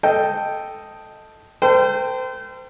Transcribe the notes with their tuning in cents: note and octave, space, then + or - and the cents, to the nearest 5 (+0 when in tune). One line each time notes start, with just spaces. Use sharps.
A4 +0 D#5 +0 G5 +0
A4 +40 C5 -35 G5 +0